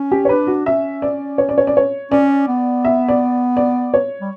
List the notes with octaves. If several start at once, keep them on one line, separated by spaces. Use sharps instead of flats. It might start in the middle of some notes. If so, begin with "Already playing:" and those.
Already playing: C#4
G4
C#5
D4 B4
F#4
C#4 E5
D5
C#5
D5
C#5
D5
C#5
C#4 D5
B3
E5
D5
D5
C#5
G3